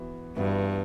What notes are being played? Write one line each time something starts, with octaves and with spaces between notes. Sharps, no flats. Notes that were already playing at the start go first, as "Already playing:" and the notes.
Already playing: E3 B3 F#4
G2 E3 B3 F#4